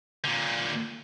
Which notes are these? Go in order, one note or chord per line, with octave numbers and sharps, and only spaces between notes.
A#2 D3